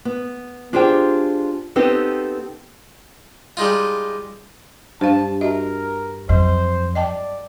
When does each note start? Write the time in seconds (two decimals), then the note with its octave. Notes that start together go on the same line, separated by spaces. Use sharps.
0.05 B3
0.73 D4 F4 G4 G#4 C5 G5
1.76 B3 C4 D#4 G4 A4 B4
3.57 G3 G#3 D#4 F4
5.01 G2 C5 F5 A5
5.41 F#4 A#4 D#5 E5
6.29 F2 F#3 C5
6.95 D5 D#5 G5 A5